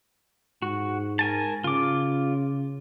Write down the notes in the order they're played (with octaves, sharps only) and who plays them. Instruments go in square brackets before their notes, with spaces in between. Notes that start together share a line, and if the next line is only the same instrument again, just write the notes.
[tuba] G#2 [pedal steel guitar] F#4
[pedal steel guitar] A#4 G#5 A5
[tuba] C#3 [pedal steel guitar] F4 D6